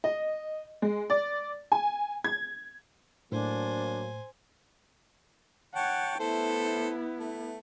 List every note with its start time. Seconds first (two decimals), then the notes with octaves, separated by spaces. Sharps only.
0.04 D#5
0.82 G#3
1.10 D5
1.72 G#5
2.24 G#6
3.32 A2 F#3 A#3 D4 C5 G#5
5.75 C#5 F#5 G5 A5
6.20 A3 B3 E4 A4 C5
7.19 A3